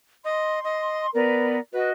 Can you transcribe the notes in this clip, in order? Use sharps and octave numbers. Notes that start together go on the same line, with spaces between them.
D#5 C6
D#5
B3 A#4 B4 D5
F#4 B4 D#5